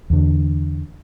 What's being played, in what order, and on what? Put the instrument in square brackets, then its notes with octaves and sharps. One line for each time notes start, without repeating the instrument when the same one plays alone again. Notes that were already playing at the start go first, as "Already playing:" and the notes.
[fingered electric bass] E2 D3